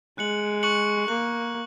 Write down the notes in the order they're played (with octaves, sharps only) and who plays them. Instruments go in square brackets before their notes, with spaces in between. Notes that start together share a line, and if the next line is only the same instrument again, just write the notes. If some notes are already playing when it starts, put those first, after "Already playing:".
[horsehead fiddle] G#3 [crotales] F#6 C#7 F#7
[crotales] C#6 F#6 C#7 F#7
[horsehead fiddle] A#3 [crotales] C#6 F#6 C#7 F#7